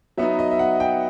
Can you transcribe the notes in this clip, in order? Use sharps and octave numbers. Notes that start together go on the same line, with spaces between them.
F#3 B3 D#4 E5
D#5
E5
F#5
G5